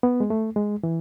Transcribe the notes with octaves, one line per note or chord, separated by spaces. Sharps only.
B3
G#3
A3
G#3
E3